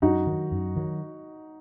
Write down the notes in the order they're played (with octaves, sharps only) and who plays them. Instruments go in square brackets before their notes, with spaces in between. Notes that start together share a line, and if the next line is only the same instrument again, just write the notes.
[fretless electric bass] F#2 [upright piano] D#4 F#4
[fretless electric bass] D#3 F#3
F#2
D#3 F#3